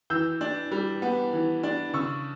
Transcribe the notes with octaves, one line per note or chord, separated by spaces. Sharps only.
E3 E6 G6
D4
G3
B3
E3
D4
C#3 C#6 E6